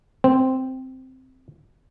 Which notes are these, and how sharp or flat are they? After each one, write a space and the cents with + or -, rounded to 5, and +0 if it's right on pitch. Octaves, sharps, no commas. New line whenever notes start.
C4 -5